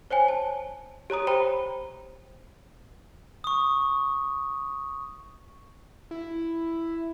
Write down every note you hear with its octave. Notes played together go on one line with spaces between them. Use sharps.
C5 C#5 G5 G#5
A5
G4 C#5 A#5 D#6
C5 G5 A#5 B5
C#6 D#6
E4